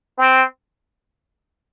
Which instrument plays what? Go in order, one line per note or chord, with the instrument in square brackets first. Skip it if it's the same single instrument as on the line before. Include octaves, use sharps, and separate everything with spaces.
[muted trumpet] C4